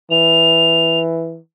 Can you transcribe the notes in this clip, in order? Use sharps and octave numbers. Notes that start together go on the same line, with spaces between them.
E3 F7